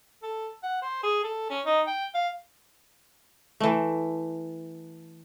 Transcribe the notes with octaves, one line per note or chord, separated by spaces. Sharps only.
A4
F#5
C5
G#4
A4
C#4
D#4
G5
F5
E3 A3